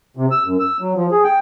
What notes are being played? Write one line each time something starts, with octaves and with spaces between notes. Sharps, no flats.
C3
E6
F#2
E6
F#3
F3
G#4
G5